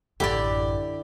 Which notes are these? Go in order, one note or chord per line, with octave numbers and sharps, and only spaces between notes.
A1 F#2 D3 E4 G4 D5